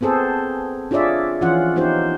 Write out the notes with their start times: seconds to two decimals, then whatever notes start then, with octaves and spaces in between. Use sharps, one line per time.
0.01 B3 C4 G#4 A4 C5
0.91 D4 F4 G#4 C#5 D5 E5
1.41 E3 F3 C#4 F4 F#5
1.76 B3 D#4 F4 G4 C5